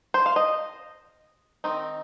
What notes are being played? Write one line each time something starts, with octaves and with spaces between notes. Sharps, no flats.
C5
F5
D#5
D#3 C4 D#4